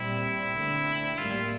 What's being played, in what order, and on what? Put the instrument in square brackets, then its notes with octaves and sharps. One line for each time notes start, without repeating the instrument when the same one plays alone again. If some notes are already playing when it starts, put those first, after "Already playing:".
Already playing: [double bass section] A#2 G3 C4 [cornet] E4
[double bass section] D3 A3 C4
[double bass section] A2 G3 A#3 [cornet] F4